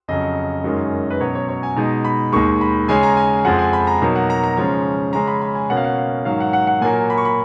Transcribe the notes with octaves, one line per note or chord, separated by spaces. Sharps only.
F2 C#3 F#3 D#5
F#2 D#3 G#3 C#4
B4
B2 F#3 C#4 C#5
C#5
C#5
G#5
B2 G#3 D#4
B5
D#2 D#3 G#3 C#6
B5
C#3 G#3 C#4 G#5
A#5
G#5
F2 F3 G#3 F#5
G#5
B5
A#5
B2 F#3 A#3 D#4
F#5
A#5
A#5
C#3 F3 G#3 C#4
C#3 G#3 C#4 A#5
B5
B5
G#5
B2 A#3 C#4 F#5
F5
F#5
F5
G#2 D#3 F#3 F5
F#5
F#5
F#5
A#2 F#3 A#3 G#5
B5
C#6
B5